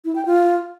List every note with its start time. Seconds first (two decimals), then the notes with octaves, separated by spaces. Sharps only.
0.05 E4
0.15 G5
0.26 F4